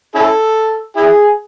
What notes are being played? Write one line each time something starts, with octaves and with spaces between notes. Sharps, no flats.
C#4 E4 A4
E4 G#4